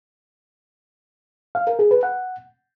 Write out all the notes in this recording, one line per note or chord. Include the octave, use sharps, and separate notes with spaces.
F5
A#4
G#4
B4
F#5